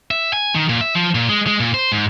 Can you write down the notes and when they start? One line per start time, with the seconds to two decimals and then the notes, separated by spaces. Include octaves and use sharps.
0.11 E5
0.33 G#5
0.55 D#3
0.69 A#2
0.81 E5
0.95 F3
1.15 A#2
1.29 G#3
1.47 G#3
1.60 A#2
1.74 C5
1.92 G#2